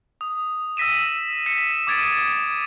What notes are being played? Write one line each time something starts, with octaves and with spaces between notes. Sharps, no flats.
D#6
E6 A#6 B6 D#7 E7
B6 C#7 E7
D6 D#6 G#6 A6 D7 D#7